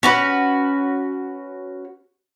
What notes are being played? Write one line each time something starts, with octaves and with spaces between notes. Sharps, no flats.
C#4 F#4 B4